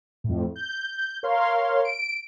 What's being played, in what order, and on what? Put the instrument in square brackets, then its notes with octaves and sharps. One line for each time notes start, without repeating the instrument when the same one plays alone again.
[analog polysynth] F2 A2
G6
A#4 C#5 F5 C6
D7